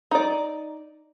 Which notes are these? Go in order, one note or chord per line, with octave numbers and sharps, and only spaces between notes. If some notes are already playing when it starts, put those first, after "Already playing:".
D#4 D5